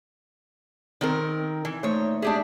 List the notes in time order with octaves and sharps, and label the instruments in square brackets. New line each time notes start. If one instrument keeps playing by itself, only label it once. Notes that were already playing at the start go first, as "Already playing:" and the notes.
[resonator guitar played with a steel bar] D#3 C4 A#4
E3
[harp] A#2 A3 D#4 [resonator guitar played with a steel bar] C5 C#5
[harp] G#3 E5 [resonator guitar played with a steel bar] D4 G4 G#4